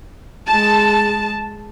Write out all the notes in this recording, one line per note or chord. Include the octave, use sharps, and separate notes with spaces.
G#3 A5